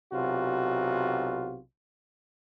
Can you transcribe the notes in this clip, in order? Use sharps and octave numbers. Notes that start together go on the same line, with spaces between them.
B1 C3 F4 F#4